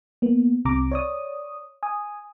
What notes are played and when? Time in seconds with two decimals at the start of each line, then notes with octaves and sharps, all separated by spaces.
0.22 A#3 B3
0.65 C2 C3 A#5 D6
0.92 C#5 D5 D#6
1.83 G#5 D#6